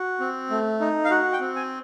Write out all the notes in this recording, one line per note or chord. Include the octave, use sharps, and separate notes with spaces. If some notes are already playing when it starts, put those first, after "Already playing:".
Already playing: F#4
C4
A3
D#4
F5
F#4 F#5
G5
C4
G#5